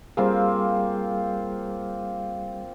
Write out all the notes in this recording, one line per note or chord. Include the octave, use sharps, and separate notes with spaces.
G3 A#3 C4 F4 G#4